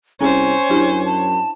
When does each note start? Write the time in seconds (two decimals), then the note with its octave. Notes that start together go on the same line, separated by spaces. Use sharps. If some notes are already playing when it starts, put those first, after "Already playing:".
0.21 C2 C#4 G#4 C5 C#5 G#5
0.70 F#2 D4 E4 G4
1.05 A5